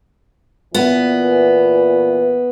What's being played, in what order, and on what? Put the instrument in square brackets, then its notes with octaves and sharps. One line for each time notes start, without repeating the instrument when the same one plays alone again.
[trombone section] A#2 E3 [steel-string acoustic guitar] B3